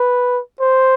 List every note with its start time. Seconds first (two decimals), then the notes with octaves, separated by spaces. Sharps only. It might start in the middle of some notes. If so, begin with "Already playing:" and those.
Already playing: B4
0.60 C5